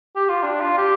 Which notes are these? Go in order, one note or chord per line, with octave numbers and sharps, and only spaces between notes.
G4
F4
D4
F4
G4